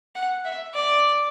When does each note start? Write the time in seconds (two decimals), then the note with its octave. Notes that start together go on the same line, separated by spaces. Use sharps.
0.15 F#5
0.45 E5
0.74 D5